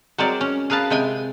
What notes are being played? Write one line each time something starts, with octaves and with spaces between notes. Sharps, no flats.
F#3 G#3 C4 A#4 D5
C#4
G#4 A#4 B4 F5 A5
C3 G#3 G5 G#5